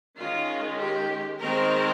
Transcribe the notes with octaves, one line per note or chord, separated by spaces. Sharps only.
D#3 G#3 C#4 F4
G4
D#3 G#3 C4 A#4